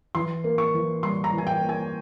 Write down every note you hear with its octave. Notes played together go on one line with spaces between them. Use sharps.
E3 C6
A#3
C#6
E3
G3 C6
A#5
E3
G#5
G5
A#3
G#5